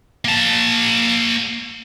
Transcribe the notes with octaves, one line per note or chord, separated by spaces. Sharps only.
A#3 A5